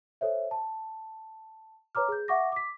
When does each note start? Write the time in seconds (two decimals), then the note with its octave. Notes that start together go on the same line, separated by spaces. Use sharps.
0.21 A4 C5 C#5 E5
0.51 A5
1.95 B4 C#5 A#5 D6 F6
2.08 G#4 G6
2.28 E5 F#5 C#6 D6 A#6
2.52 D6 B6